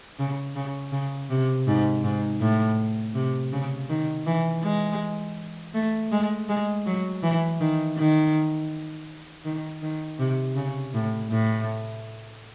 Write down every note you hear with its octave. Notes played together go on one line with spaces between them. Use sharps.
C#3
C#3
C#3
C3
G#2
G#2
A2
C3
C#3
D#3
E3
G#3
A3
G#3
G#3
F#3
E3
D#3
D#3
D#3
D#3
C3
C#3
A2
A2